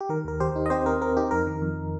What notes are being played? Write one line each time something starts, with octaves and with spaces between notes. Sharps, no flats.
G4
D#3 A#4
D#2 A#4
D#2 G4 C5
D#4
D#5
C4 G4 C5
C4 A#4
C4 A#4
D#4 G4
F2 A#4
D#3
F2